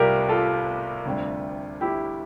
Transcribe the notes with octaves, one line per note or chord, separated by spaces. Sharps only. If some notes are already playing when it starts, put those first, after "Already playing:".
Already playing: C2 C3 G3 F4 G4 A#4
F4 A4
D2 C3 G3
E4 G4